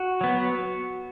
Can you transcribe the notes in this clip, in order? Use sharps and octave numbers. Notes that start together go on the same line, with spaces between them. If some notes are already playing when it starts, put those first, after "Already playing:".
Already playing: F#4
F#3 B3